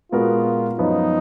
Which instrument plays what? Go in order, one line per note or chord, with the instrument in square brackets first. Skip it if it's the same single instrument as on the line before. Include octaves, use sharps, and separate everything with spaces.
[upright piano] A#2 G#3 B3 F#4 A#4 [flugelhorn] F4
[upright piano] F#2 F3 B3 [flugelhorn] D#4